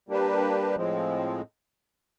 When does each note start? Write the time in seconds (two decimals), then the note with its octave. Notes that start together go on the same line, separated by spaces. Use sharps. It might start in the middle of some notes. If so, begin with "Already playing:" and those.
0.09 G3 A#3 D4 G4 B4
0.75 A2 F3 G#3 C4